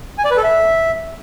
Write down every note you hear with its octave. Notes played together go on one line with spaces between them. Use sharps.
G#5
D5
B4
A4
E5